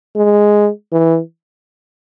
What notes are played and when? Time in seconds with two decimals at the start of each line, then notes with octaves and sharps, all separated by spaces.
0.16 G#3
0.92 E3